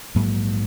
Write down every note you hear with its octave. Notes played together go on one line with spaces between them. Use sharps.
A#1 G#2 F#3 A#3